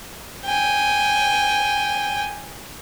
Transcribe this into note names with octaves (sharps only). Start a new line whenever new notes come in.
G5 G#5